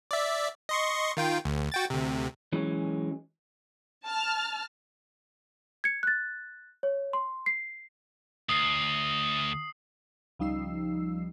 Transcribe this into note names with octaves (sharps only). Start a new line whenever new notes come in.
D5 E5
D#5 C6 C#6
D#3 F4 G5
D2
F#4 G5 A6
D2 C3
E3 F#3 G#3 C#4
A5 F6
G#6 C#7
F#6 A6
C#5
C6
C7
D2 D#6 C7
C#2 F3 G3 D#4 E6 C7